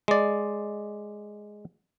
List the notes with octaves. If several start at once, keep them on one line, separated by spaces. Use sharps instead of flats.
G#3 D5